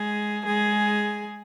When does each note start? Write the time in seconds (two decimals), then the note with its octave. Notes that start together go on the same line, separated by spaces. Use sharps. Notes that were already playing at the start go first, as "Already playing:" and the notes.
Already playing: G#3 G#4
0.45 G#3 G#4